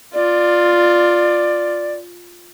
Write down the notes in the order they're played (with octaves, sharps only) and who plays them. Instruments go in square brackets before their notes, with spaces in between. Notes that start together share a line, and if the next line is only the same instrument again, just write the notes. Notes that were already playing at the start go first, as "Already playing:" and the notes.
[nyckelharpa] F4 [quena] D5